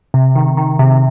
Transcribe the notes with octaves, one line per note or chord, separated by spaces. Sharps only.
C3
D#3
D#3
C3